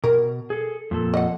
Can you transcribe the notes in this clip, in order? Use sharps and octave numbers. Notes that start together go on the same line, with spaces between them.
B2 A#4
G#4 A4
F2 A#2 A4
D#5 F#5